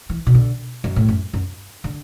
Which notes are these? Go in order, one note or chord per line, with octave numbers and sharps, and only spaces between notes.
E3
B2
D3
F#2
A2
F#2
F#2
D3